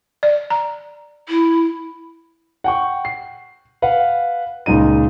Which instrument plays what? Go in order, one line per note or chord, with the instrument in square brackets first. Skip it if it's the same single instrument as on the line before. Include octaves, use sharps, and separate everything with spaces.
[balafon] D5
A#5
[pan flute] E4
[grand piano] F#5 G5 C#6
C7
B4 F5 F#5
C#2 A#2 D#4 D#7